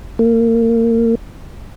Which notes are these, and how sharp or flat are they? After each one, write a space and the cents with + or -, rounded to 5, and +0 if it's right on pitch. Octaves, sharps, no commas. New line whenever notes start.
A#3 -25